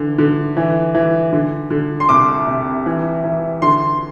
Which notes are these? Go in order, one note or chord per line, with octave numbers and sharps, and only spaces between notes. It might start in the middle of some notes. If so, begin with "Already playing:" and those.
Already playing: D3 E3
D3
E3
E3
D3
D3
C6
C2 D6
C3
E3
E3
D3 C6